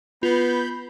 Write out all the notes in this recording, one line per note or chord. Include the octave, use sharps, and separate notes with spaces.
B3 F4 B5 G6